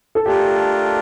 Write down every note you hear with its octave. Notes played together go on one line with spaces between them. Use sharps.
A4
A3 D4 F4 G4 A#4